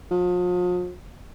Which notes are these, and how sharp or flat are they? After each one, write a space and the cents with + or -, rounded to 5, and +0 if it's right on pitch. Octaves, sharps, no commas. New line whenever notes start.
F3 +40